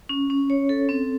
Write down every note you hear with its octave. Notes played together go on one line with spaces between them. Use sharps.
C#4
C#4
C#5
A4
C4